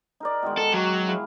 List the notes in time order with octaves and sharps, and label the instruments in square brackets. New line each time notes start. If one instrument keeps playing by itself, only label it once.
[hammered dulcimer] D#4 A#4 D5
B2 D#3 G#3
[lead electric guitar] A4
F#3
[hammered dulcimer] E4 G#4 F5